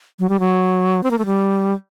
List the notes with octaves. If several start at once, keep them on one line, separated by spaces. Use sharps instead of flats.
F#3
G3
F#3
C4
A#3
A3
G3